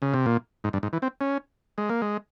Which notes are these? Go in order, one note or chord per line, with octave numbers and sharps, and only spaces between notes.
C#3
C3
A#2
G#2
G2
G#2
E3
C4
C#4
G#3
A#3
G#3